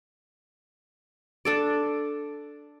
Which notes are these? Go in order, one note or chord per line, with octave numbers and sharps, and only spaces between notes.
D4 A4 D5